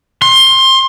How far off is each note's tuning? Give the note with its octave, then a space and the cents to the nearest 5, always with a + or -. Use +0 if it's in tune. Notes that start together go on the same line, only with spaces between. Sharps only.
C6 +20